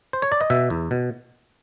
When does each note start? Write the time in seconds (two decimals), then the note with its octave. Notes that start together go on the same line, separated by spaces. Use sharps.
0.13 C5
0.22 C#5
0.32 D5
0.41 D#5
0.50 B2 E5
0.70 E2
0.91 B2